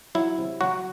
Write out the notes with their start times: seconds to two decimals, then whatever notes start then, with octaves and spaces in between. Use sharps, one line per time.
0.15 F#3 E4
0.38 C3
0.61 F#3 F#4